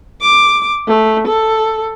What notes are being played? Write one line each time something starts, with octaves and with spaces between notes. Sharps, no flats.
D6
A3
A4